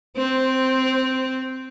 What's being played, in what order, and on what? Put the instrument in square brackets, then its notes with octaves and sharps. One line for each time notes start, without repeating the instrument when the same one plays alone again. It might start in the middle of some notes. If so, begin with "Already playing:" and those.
[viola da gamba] C4 [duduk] C5